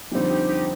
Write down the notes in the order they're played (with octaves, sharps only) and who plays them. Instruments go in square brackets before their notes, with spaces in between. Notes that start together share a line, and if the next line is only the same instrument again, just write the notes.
[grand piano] F2 D3 G3 C4 [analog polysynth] D#4 G4
[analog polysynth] D#4 G4
D#4 G4